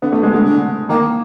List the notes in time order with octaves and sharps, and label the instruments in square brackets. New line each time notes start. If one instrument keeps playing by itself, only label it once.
[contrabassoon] D3 [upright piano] B3
[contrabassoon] D3 [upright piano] A3
[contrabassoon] D3 [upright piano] G#3
[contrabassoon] D3 [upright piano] G#3
[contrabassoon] D3
[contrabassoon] D#3 [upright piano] A#3